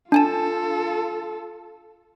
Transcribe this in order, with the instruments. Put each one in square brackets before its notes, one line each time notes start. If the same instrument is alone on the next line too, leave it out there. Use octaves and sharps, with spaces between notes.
[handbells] D4 G#5 A5 [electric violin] F4 A4